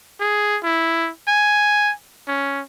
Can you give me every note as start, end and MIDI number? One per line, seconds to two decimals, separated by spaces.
0.20 0.59 68
0.64 1.10 64
1.28 1.93 80
2.27 2.62 61